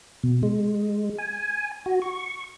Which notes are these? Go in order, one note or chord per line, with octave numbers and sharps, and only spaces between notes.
B2
G#3
G#5
F#4
C#6